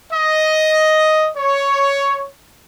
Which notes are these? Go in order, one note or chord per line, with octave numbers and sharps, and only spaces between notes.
D#5
C#5